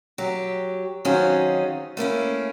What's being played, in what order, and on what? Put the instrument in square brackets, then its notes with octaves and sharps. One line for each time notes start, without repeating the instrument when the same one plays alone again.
[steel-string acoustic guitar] F#3 G4
D#3 F#3 C4 C#4 F4 G#4
A3 A#3 C#4 E4